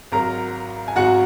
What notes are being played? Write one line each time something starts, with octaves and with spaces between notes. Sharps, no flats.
G#1 G#2 F#3 A#4 A#5
G#5
G#1 G#2 F#3 F#4 F#5